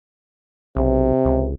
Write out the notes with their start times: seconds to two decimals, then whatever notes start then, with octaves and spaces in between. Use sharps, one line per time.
0.76 B1 C3
1.25 C#2